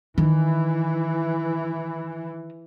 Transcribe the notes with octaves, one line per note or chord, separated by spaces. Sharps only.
D#3 E3